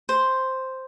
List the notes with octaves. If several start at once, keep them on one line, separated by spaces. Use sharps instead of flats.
C5